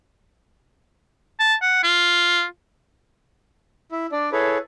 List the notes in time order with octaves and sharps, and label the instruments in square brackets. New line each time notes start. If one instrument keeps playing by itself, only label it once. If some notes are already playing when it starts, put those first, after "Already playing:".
[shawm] A5
F#5
F4
[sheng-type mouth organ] E4
D4 D5
E4 G#4 A4 B4 C#5